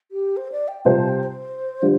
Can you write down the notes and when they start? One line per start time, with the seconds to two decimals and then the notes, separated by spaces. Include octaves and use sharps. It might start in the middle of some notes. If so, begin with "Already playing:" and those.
0.12 G4
0.37 C5
0.52 D5
0.68 G5
0.85 C3 G3 F4 C5 G5
0.98 A5
1.09 G5
1.21 C5
1.82 D3 G3 F4